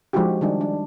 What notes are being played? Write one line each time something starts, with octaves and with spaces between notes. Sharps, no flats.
F3 G#3 D4 D#4 F#4 G4
D#3 G3 D4 D#4
D4